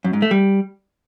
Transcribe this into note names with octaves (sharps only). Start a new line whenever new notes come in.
F#2
G#2
A3
G3